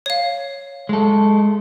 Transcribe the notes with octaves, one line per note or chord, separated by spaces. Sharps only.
C#5 F5
G#3 A4